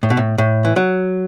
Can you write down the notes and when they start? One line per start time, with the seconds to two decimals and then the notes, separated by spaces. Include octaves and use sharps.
0.03 A2
0.10 B2
0.17 A2
0.38 A2
0.65 E3
0.76 F#3